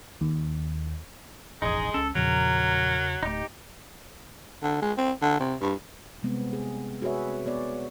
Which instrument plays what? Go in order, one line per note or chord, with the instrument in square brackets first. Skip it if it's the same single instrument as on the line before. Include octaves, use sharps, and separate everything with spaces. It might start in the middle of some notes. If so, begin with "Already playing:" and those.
[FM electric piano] D#2
[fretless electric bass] E1 A1 F2 [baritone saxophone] G#3 [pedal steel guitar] D#4 G#4
[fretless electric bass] C#2 C#4 [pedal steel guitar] A4
[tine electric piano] E2 C#3 [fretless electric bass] A#2 F3 [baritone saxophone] F#3 [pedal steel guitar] A#4
[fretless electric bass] D1 A3 [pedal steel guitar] D#4 G4
[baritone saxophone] D3
G#3
C4
D3
C3
G2
[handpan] C3 G3 G#3 B3 C4
G#4
F#4 G#4 B4 C#5 E5
C4
B3 C#5 D5